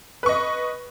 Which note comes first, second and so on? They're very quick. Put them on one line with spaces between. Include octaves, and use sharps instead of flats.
B4 C#6 D#5